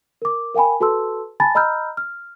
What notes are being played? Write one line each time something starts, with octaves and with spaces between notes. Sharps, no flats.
A#4 D6
A#4 F5 G5 G#5 B5
F#4 A4 B4 A5 C6 E6
G#5 A5 B5 A6
D#5 A#5 B5 E6 F6 G6
F6